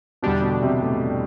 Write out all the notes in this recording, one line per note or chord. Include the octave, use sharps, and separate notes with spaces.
E2 B2 D3 G3 D4 G4
B2
C3
A2